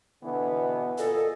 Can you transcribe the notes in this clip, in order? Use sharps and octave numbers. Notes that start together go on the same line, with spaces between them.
B2 D3 E3 B3
A#2 G#4 A4 D#5